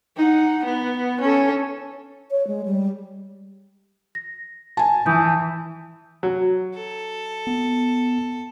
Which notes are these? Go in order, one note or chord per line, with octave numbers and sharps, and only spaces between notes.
D#4 F#5
B3
C#4 A4
C#5
G#3
G3
A#6
G#5 A5
E3 D#6 G6
F#3
A4
B3